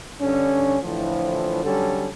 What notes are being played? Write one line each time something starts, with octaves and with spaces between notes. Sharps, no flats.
G2 D3 C#4
A2 D3 E3 F3
D3 F#3 G3 C#4 A4